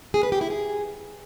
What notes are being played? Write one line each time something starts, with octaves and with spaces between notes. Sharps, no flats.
G#4
B4
G4
E4
G#4